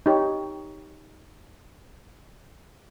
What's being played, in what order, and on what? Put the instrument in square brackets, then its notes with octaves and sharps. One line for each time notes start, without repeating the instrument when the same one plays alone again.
[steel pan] D#4 G4 C#5